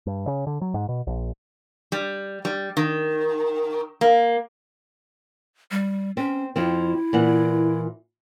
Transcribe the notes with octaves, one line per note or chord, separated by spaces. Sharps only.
G2
C#3
D3
F#3
G#2
B2
A#1
G3
G3
D#3
A#3
G3
C4 C#4
F2 F3 C4 E4
A#2 E3 F#5